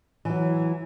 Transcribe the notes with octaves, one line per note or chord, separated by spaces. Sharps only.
E3 F#3